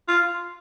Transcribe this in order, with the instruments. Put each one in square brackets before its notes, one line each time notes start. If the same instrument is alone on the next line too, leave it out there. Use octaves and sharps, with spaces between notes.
[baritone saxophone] F4